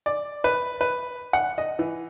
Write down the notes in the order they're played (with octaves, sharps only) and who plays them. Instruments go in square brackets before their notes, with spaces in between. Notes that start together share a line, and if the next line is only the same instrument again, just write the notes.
[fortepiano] D5
B4
B4
F#5
D#5
E3